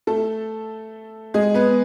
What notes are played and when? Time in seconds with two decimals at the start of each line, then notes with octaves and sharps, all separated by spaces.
0.07 A3 A4
1.34 G#3 G#4
1.54 B3 B4